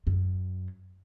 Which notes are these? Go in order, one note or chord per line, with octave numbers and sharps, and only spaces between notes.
F#2